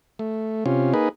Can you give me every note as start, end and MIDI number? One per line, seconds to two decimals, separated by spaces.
0.19 0.64 57
0.66 0.93 48
0.66 0.93 61
0.66 0.93 65
0.94 1.09 58
0.94 1.09 63
0.94 1.09 68
0.94 1.09 71